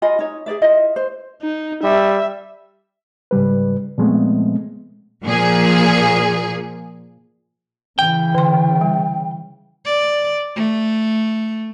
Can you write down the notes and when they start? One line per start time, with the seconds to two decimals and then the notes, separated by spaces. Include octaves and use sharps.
0.02 F4 D#5 G#5 B5
0.19 D#4 C#5
0.46 G#4 C5 D5 E5
0.62 E4 F4 D#5
0.96 C5
1.42 D#4
1.83 G3 E5
3.31 G#2 C#3 G3 B4
3.98 A#2 F3 G#3 A3 B3 C4
5.23 A#2 F3 G#4
7.99 C#3 E3 G5
8.35 D3 C6
8.81 G3
9.85 D5
10.56 A3